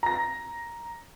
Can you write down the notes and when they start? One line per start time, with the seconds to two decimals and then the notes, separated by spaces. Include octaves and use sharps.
0.03 A#5 A#6